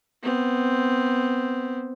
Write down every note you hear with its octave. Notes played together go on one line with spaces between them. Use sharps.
B3 C4